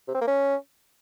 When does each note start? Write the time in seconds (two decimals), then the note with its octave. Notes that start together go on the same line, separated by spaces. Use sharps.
0.08 C3
0.15 C4
0.21 A#3
0.28 C#4